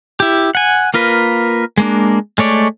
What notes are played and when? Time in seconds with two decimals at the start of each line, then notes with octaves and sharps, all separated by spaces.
0.20 E4 G4
0.55 F#5 G#5
0.94 A#3 F4 A#4 B4
1.78 G#3 A#3 D4
2.38 G#3 A3 C#5 D5